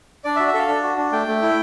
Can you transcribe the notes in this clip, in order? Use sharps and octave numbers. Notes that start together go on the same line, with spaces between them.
D4 D5
E5
F#4
E5
A4 F5
D4
F#4
D4
A3 G5
A3
E4